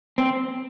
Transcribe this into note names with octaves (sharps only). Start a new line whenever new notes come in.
C4